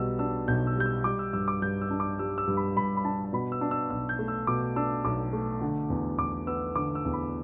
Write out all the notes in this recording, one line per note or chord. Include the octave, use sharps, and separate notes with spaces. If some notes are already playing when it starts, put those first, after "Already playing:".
Already playing: B1 B2 G3 E6
D4 E6
B1 G6
E6
G3 G6
E6
G3 D6
E6
G2 E6
D6
G2 G6
E6
D4
D6
G3 E6
E6
G2
B5
G2 B5
B5
D4 A5
A5
B2 B5
E6
D4
E6
B1 E6
G6
A3
E6
B2 D6
D4 E6
B1 D6
A3
D3
E2
E2 D6
B3 E6
D3 D6
E6
E2
B5